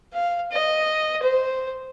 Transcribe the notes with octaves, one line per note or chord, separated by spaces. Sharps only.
F5
D#5
C5